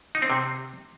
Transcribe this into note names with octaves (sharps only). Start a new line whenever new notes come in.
D#4
C4
C3